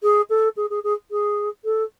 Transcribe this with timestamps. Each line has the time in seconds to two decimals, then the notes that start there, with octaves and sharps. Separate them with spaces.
0.02 G#4
0.29 A4
0.56 G#4
0.70 G#4
0.83 G#4
1.11 G#4
1.64 A4